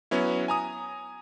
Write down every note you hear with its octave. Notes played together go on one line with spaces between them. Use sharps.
F#3 B3 C#4 E4
G#5 A#5 D#6